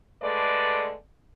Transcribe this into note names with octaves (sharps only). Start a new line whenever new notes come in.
D3 G#3 A3 B4 D5